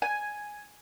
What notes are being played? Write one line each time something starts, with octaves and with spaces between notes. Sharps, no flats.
G#5